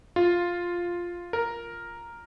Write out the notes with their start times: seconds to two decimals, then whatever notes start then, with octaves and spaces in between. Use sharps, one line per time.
0.16 F4
1.33 A#4